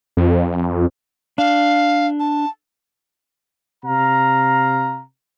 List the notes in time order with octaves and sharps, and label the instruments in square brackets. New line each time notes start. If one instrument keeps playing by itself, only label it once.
[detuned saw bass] F2
[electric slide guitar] D4 [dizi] F5
[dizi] A5
[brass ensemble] C3 F5 A#5